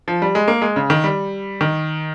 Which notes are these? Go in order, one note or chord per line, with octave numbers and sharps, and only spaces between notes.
F3
G3
G#3
A#3
G#3
C#3
D#3
G3
D#3